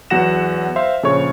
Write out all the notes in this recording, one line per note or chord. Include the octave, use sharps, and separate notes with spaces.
E2 F#3 F#4 F#5 A#6 E7
C5 E5 F5 C6
A#1 C#3 A4 C5 C#5 C#6